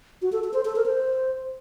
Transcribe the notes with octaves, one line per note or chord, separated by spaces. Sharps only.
F#4
A4
A4
C5
A4
A#4
C5